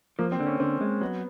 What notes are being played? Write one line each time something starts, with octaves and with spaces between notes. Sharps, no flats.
F3 A#3
C4
D3
C#4
D3 C4
G#3
F#3 B3